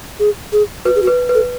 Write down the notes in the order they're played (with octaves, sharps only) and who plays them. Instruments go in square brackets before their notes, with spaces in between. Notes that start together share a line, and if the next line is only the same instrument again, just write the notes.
[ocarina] G#4
G#4
[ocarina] F#4 [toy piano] B4
[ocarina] G#4
F#4
[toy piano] B4
B4
[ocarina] A4